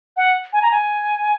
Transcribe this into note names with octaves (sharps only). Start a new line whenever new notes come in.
F#5
G#5
A#5
G#5